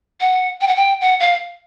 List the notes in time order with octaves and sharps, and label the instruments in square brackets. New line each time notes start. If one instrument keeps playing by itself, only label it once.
[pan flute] F#5
G5
F#5
G5
F#5
F5